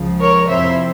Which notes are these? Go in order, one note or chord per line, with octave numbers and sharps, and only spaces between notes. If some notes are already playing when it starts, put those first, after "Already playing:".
Already playing: C#2 C#3 F3
A#4 C#5
F2 C3 F3 C4 E4 C5 E5